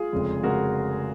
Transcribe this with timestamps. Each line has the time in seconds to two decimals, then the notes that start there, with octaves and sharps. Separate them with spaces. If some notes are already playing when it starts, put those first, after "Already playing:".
Already playing: F4 G#4
0.13 F1 F2 C#3 G#3
0.43 C#3 G#3 F#4 A#4